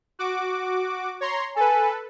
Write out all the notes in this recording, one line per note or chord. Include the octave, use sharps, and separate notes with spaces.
F#4 D6
C#5 A#5 C6
A4 B4 G#5